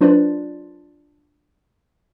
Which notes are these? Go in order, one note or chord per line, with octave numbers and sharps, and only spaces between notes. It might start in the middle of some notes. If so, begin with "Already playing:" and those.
F#3 D4 F4 B4 C5 D5